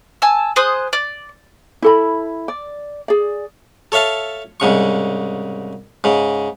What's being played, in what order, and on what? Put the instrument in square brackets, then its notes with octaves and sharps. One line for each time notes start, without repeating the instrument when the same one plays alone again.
[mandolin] G#5 A5 E6
G#4 C5 D#6 F#6
D5
[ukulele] E4 A4 B5
D5
G#4 D5
[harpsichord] A4 C#5 E5 F5 A5
C2 G#2 C#3 C#6
G#2 C#3